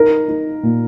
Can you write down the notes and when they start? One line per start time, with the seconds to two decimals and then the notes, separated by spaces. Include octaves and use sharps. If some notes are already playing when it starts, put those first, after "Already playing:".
Already playing: D#4 A#4
0.28 D#4
0.63 A#2